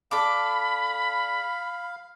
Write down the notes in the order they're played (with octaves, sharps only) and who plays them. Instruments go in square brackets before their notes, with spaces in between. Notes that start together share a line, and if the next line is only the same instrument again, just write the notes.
[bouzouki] D4 A4 [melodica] F5 [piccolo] B5 [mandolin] D6